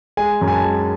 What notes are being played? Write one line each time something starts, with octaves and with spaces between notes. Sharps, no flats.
G#3 G#5
F#2
G#5
A5
G#3